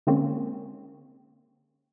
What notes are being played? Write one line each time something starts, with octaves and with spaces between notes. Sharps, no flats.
D3 G#3 A#3 C4 C#4